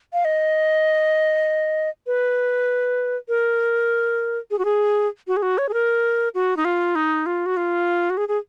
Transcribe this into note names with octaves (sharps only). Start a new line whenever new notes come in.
F5
D#5
B4
A#4
G#4
F#4
G#4
F#4
G#4
F#4
C#5
G#4
A#4
F#4
D#4
F4
D#4
F4
F#4
F4
F#4
G#4
G#4